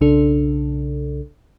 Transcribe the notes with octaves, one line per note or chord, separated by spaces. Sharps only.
B1 C#3 D4 A4